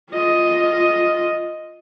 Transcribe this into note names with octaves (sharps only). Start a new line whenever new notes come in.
F4 D#5